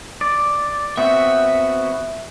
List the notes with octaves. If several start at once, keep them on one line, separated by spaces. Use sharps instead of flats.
D5
B3 C4 F#4 E5